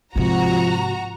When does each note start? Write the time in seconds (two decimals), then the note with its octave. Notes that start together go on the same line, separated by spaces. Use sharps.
0.16 G#2 C3 F3 F#4 A#5